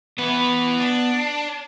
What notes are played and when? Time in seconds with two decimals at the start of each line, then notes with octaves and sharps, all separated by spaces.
0.18 E3 B3 B4
0.79 D4